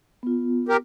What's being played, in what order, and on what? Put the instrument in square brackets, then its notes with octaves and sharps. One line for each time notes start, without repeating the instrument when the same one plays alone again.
[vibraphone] B3 F4
[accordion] G4 A#4